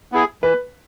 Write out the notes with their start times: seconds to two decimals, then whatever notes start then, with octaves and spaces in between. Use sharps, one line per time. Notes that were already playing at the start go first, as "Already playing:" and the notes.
0.12 B3 E4 G#4
0.43 E3 B4